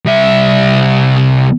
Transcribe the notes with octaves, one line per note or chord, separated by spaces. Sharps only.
C2 E5